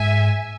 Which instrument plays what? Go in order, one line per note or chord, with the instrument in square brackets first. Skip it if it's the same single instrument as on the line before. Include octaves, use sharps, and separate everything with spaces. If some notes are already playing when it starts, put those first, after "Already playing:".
Already playing: [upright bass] G#2 [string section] E5 G#5